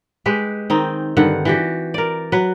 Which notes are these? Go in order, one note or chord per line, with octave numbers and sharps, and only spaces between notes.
G#3 G4 B4
D#3 C4 D#4
G2 D3 D#3 F#5
E3 F#4 G4
A#4 D5
F#3 B4